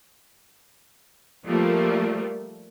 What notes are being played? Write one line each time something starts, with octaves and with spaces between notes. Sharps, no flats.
F3 G3 A3 A#3